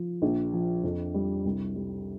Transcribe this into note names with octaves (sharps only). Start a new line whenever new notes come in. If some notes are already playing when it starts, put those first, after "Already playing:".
Already playing: F3
A#1
F3
F2
G3
C2
G3